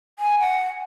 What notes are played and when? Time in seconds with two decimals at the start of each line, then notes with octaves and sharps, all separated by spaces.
0.19 G#5
0.40 F#5